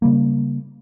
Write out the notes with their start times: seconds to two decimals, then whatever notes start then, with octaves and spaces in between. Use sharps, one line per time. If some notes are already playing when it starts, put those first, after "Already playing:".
0.02 C#3 G3 A#3